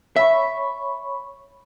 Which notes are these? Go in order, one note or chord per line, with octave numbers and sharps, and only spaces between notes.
C#5 E5 B5 C#6